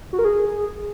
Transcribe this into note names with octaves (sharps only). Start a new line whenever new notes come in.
F#4
A#4
G#4